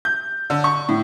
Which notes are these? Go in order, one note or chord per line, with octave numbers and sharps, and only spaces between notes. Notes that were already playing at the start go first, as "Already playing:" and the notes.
G6
D3
C#6
A2